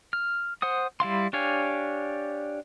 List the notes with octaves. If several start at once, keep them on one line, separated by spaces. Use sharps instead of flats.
F6
C5 F#5 D#6
G3 E4 F5 C6
D4 G4 C#5 F5 G#5